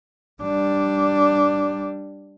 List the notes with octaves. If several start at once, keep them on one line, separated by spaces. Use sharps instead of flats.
G3 D4